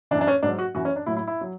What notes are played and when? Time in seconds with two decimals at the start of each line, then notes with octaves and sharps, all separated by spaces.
0.11 E3 D4
0.15 F#2
0.21 D4
0.27 C#4
0.43 G#2 F#3 D4
0.59 F#4
0.74 F#2 E3 F#4
0.85 C#4
0.96 D4
1.06 A2 F#3 E4
1.17 E4
1.27 E4
1.41 F#3